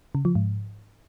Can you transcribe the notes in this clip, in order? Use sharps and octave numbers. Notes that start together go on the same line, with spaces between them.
C#3
F3
G#2